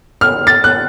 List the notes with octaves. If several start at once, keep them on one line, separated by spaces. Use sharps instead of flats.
F6
A6
F#6